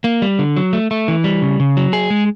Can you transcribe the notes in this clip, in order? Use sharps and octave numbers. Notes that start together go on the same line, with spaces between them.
A#3
G3
D3
F#3
A3
A3
E3
G3
C#3
C#3
F#3
G#4
G#3